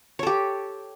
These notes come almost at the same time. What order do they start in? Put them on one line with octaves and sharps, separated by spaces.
C#5 A4 G4